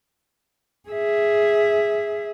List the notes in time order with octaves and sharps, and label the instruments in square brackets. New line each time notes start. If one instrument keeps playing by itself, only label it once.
[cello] G#4 E5